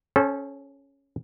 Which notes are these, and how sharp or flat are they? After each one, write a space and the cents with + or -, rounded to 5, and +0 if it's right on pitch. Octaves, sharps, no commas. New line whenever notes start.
C#4 +0 A4 -25 C5 +30